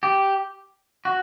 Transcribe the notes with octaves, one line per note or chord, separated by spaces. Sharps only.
G4
F#4